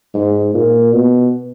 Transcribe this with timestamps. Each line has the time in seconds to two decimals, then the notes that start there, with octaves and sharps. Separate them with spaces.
0.14 G#2
0.54 A#2
0.93 B2